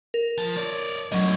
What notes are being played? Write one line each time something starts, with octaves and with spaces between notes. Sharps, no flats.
A#4
F3 A5
C#5 D5
F#2 A2 F#3 D#5